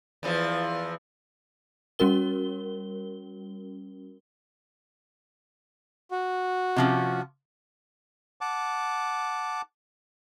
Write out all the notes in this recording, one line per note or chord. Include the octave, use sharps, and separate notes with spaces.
E2 E3 F3
G3 C#4 F#4 A#4 G7
F#4
C3 F3 C#4
F#5 A5 D6